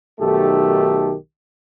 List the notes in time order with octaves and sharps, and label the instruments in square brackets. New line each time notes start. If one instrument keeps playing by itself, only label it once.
[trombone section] B1 D#3 A3 G4 A4